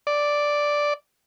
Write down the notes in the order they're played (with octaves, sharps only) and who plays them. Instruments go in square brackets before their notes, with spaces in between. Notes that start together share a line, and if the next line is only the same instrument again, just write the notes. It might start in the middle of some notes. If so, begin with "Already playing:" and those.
[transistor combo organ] D5